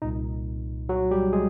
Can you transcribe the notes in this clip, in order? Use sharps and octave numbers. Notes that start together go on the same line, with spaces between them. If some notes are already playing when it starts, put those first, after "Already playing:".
C2 A#2 D#4
F#3 F#4
G3 G4
G#3 G#4